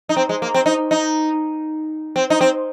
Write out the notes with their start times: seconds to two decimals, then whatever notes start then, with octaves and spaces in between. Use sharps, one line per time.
0.09 D#4
0.17 C4
0.29 G#3
0.42 A#3
0.54 C4
0.66 D#4
0.91 D#4
2.16 C4
2.30 D#4
2.41 C4